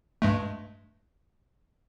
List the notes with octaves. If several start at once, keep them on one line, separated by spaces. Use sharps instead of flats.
G2 G#3 A3